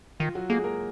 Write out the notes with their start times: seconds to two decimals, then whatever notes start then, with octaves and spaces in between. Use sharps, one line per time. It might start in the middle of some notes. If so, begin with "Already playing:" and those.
0.20 D#3 F4
0.35 F#3 F#4
0.50 G#3 A#3 G#4
0.64 A#3 A#4